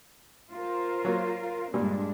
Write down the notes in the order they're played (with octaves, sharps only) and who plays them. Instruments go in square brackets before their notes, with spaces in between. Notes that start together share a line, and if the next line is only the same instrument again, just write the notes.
[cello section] F4 A#4 C5
[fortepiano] F#3 A#3
[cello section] G2 G#3 D4 [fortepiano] A#2 G3